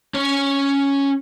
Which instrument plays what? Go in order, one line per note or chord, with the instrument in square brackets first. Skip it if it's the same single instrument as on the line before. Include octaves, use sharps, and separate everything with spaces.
[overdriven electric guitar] C#4 C#5